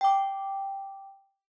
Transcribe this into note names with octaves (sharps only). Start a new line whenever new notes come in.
G5 D6